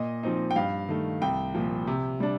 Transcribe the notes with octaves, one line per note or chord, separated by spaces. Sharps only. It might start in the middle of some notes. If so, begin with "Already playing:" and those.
Already playing: A#2 D#5
F3 C4 D#4
G5
G2 F5
D#3 A3
C2 G5
A#2 F3
C3
G3 D4